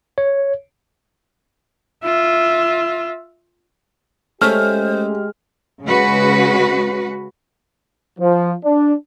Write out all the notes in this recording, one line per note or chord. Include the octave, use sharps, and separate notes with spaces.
C#5
F4 E5
G#3 A3 C#4 G4 C5 E5 F6
C#3 G#3 F#4 B4
F3
D4